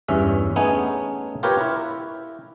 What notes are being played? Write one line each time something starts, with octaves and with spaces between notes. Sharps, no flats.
E2 G2 C#4 E5
A3 B3 C#4 D#4 G#4
F4 G4 A#4 B4 C#5
E4